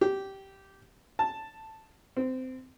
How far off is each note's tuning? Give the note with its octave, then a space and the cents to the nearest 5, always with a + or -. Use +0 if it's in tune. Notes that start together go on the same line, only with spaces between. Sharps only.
G4 -10
A5 +5
C4 -20